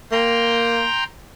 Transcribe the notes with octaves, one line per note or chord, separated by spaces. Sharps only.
A#3 G5 A#5 C6